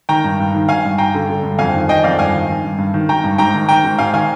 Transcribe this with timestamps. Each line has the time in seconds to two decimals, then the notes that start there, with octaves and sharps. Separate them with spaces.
0.09 D#3 G5 A#5
0.24 G2
0.39 G2
0.55 D#3
0.69 D#3 F5 G#5
0.85 G2
0.98 G2 G5 A#5
1.15 D3
1.29 D3
1.43 G2
1.59 F2 F5 G#5
1.73 D#3
1.89 D#3 D#5 G5
2.03 F2 D5 F5
2.19 G2 F5 G#5
2.34 D#3
2.49 D#3
2.64 G2
2.78 G2
2.94 D#3
3.09 D#3 G5 A#5
3.24 G2
3.38 G#2 G5 A#5
3.54 D#3
3.69 D#3 G5 A#5
3.84 G#2
3.99 G#2 F5 G#5
4.13 D#3 F5 G#5